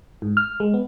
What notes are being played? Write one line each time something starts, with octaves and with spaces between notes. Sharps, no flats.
G#2
F6
G#3
B3